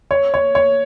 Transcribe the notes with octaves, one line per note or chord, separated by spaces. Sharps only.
C#5
C#5
C#5